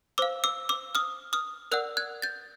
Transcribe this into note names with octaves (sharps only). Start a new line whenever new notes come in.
C5 F5 D6 E6
D6 E6
D6 E6
D#6 F6
D#6 F6
A#4 D5 F#5 E6 F#6
F#6 G#6
G6 A6